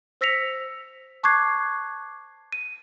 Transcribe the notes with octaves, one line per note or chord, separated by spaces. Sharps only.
C5 E6 A#6 B6 C#7 F7
A5 C#6 D6 F#6 G#6 C7
D#7